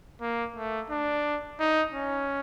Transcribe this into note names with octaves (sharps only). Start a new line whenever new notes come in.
A#3
A3
D4
D#4
C#4